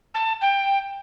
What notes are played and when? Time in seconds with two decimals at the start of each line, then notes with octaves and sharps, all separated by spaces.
0.14 A5
0.41 G5